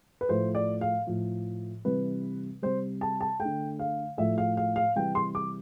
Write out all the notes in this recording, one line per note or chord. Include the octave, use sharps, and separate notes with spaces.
B4
A2 F3 A3 C5
D5
F5
A2 F3 A3
C3 E3 G3 B4
C3 G3 C5
A5
A5
A3 G5
D3
F5
A2 F3 A3 E5
F5
F5
F5
C3 E3 G3 G5
C6
D6